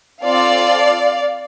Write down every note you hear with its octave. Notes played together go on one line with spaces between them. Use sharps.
C4 F4 A4 D5 F5